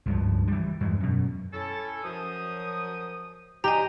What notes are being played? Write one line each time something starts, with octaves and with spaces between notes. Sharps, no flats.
C#2 G2 F3
E3 G3
E2 G2 G#3
F#2 B2
C#4 E4 A4
F#2 F3 D#6
D4 G4 C5 D#5 G#5 A#5